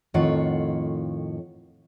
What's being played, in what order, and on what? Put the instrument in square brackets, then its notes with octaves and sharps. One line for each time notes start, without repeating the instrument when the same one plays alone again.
[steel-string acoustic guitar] F2 A2 D#3 F4 C#5 F#5